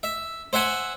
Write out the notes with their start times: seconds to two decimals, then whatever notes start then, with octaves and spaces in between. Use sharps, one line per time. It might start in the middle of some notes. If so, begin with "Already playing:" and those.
0.03 E5
0.53 C5 E5 F#5 G#5